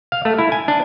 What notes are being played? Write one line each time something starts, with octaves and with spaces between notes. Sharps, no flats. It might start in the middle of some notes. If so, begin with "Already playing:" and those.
F5
A3
E4
G#5
D4